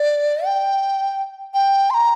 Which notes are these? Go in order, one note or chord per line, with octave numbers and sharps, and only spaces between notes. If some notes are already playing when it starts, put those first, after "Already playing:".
Already playing: D5
G5
G5
C6
A#5